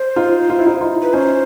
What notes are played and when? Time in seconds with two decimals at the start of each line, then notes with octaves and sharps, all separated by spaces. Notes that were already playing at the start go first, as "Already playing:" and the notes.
Already playing: C5
0.16 D#4 F4
0.50 F4
0.58 E4
0.66 D#4 F4
0.81 D#4 F4
1.02 B4
1.13 C#4 D#4 C5